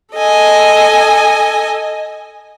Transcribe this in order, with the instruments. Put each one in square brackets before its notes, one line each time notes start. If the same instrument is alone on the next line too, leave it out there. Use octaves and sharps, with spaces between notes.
[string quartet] A4 D#5 G#5